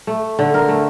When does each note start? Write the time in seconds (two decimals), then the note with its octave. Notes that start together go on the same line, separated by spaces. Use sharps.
0.07 A3
0.39 D3
0.54 A#4
0.68 A3